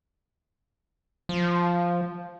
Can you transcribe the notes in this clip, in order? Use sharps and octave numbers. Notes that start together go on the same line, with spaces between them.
F3